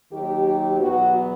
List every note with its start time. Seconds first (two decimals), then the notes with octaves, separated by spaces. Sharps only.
0.12 D#2 D#3 F#3 G4
0.45 G4
0.78 E2 B2 F#3 B3 F#4